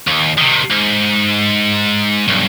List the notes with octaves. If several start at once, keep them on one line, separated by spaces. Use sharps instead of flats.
D#2
C3 D#3
G#2
B1 G2